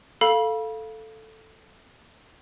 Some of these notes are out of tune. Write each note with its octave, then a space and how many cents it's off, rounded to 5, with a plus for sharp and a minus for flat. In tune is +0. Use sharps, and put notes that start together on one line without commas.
A4 +0 F5 +0 B5 -35